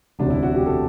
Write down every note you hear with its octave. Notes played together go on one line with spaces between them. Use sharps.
E1 D2 C3 F#3 D4
E4
F#4
G4
A4